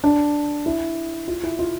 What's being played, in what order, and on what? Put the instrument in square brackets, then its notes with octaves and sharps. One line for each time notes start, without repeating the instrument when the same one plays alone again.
[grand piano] D4
E4
F4
E4
F4